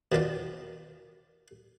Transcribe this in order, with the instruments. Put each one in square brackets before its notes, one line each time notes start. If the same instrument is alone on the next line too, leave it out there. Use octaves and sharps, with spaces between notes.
[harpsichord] B2 D#3 F4 D5